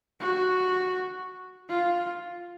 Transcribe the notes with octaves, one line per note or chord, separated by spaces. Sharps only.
F#4
F4